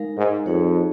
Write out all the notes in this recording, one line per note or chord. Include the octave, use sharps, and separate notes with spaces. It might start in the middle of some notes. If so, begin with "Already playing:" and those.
Already playing: G#3 D#4 A#4 F5
G#2
F2 D#4 G#4 C#5 F5